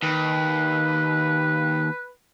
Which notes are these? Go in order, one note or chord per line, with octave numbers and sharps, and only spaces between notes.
D#2 B4